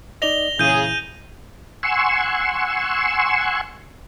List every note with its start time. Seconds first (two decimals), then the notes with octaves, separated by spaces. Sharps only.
0.22 D#4 D5 D#5 A#6 F7 G7
0.59 A#2 C#3 E3 E4 G#4 G6 D#7
1.83 F#5 G#5 C6 C#6 E6